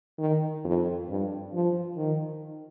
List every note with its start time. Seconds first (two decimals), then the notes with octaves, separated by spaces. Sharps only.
0.19 D#3
0.64 F2
1.09 G2
1.54 F3
1.97 D#3